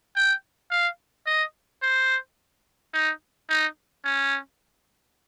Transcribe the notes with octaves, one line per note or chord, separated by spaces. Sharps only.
G5
F5
D#5
C5
D#4
D#4
C#4